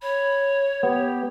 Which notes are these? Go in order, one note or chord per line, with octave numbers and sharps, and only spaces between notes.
C#5 B5
B3 G4